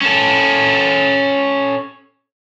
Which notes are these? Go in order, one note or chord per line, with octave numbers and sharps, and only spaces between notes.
C#4 A4